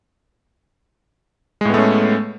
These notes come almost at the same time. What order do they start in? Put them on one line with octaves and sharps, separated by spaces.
G#3 A2 B3 A3 C#4